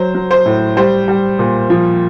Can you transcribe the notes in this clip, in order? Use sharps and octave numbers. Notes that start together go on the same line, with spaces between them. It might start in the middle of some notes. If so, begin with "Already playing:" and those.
Already playing: F#3 C5
F#3
C5
A2
G3 C5
G3
A#2
F3